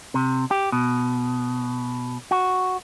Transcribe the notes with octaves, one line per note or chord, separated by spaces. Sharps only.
C3
G4
B2
F#4